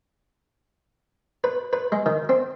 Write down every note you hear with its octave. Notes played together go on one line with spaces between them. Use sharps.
B4
B4
G#3
D#3
C4